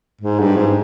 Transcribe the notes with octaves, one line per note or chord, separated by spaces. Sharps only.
G#2
G2
G#2